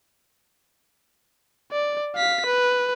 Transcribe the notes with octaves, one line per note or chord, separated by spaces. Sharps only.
D5
F5 B6
B4